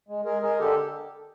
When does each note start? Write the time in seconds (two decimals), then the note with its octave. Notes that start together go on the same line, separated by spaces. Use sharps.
0.08 G#3
0.25 G#3 G#4 A#4
0.42 G#3 G#4 A#4
0.59 D3 G4 A4